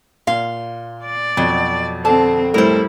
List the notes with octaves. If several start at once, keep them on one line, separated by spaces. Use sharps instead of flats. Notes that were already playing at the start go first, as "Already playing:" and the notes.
A#2 F5 C6
D5
F2 B2 F3 F#3
D3 C4 A5
A2 G3 E4 A#4 C5